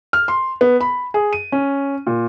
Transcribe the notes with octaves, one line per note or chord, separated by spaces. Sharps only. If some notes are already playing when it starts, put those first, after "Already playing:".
F6
C6
B3
B5
G#4
D#7
C#4
A#2